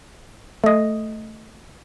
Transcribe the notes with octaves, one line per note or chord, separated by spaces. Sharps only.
A3 D#5